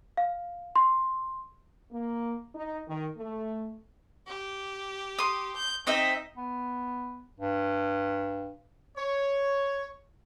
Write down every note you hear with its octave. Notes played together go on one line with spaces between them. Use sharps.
F5
C6
A#3
D#4
D#3
A3
G4
C6 D#6
G6
C4 D#4 D#5 E5
B3
G2
C#5